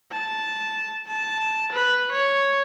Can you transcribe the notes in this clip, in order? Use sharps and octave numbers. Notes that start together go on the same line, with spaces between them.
A5
A5
B4
C#5